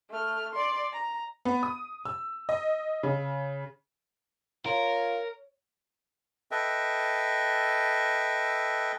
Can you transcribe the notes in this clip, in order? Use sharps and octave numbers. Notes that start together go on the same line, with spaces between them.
A3 F6
D5 C6
A#5
B3
D#6
E6
D#5
C#3
F4 A#4 C#5
A4 B4 D#5 E5 G5